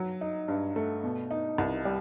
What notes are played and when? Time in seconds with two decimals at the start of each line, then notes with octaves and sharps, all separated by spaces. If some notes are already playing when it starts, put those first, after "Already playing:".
Already playing: F#3
0.21 D#4
0.48 G2
0.76 A3
1.04 B2
1.31 D#4
1.58 C2
1.85 G3